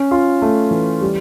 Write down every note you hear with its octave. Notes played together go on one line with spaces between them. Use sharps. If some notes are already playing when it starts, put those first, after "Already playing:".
Already playing: C#4
F4
A3
E3
G3